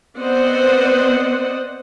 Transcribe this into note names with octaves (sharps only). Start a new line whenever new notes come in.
B3 C4 C5 D5 D#5 F#5